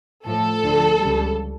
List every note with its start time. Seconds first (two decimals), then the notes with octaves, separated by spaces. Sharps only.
0.25 A2 F3 A4
0.63 D2 D3 F3
1.01 C#2 C#3 G3